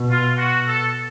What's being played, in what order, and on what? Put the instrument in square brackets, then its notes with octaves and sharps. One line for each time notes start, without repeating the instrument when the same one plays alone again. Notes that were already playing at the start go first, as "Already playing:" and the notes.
Already playing: [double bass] B2
[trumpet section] F4
F#4
A4